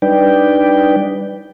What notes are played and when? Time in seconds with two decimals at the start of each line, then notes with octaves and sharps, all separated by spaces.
0.02 G3 D4 D#4 B4 D5 G5